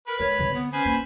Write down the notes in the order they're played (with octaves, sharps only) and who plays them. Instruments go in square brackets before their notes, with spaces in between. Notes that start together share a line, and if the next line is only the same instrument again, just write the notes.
[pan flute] A#4 [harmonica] B4
[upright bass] G#3 [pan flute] C#5
[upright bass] D3 C4
[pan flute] B3
[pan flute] C#4 [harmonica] B4 C5 G#5
[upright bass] A#3